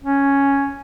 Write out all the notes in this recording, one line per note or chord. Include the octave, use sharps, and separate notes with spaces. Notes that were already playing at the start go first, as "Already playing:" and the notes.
C#4